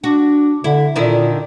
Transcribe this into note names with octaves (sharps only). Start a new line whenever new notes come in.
D4 F#4
D3 E4
A#2 D3 D#3 E4